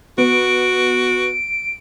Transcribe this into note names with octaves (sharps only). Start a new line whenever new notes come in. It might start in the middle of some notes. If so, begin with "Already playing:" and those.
B3 F#4 D7